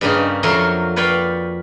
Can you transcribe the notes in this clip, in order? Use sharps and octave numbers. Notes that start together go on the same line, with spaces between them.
G2 C#3 G3 A#3 C#4 D#4
F2 F#3 A#4 C#5 E5 C6
B4 C#5 D5 F5 G5